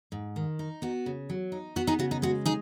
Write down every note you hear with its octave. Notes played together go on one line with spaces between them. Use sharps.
G#2
D#3
D#4
B3 F#4
C#3
F#3
D#4
B3 F#4
D#4 G#4
C#3 F#4
D#4
G#3 F#4
D#4 G#4